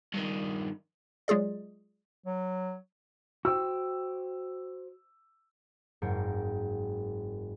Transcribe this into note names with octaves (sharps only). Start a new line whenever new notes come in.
G2 D#3
F#3 G#3 F4 G#4 D5
F#3
F#4 C5 G5 E6
F#1 G#2 A#4 G5 C7 C#7